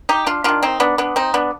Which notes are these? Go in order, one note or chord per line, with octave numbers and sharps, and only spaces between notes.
D#4 G4
D4 F4
D#3 B3 D4 F4
C4 D#4
B3 D4
B3 D4
C4 D#4
B3 D4